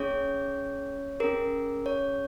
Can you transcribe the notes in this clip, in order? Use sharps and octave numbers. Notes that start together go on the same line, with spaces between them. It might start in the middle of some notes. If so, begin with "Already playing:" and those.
Already playing: A#3 C#4 G#4 C#5
C#4 G#4 A#4
C#5